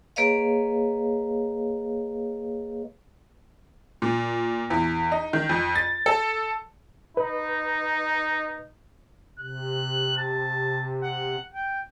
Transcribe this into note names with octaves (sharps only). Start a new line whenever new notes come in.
A#3 G#4 B4 C#5 D#5 F5
A#2
E2
D#4
D#3
F2
A6
A4
D#4 B4
C3 F#6
A5
F#5
G5